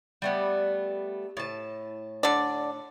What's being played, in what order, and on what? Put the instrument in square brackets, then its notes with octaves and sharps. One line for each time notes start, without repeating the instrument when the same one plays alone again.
[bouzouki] G3 A3 B3
A2 A5
[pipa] D3 D5